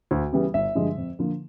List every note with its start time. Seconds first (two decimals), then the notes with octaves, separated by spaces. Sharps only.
0.11 D2
0.33 C#3 E3 G3 B3
0.54 G1 E5
0.75 G2 D3 F3 G#3
0.98 F2
1.19 D3 F3 A#3